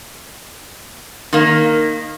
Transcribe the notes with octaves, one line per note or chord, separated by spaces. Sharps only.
D#3 A#3